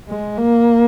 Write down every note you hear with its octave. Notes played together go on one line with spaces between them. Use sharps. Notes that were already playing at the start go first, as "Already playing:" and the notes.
G#3
A#3